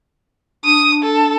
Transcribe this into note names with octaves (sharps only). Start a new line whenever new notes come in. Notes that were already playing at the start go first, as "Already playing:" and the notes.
D4 D#6
A4